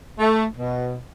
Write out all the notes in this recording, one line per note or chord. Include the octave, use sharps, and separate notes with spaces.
A3
B2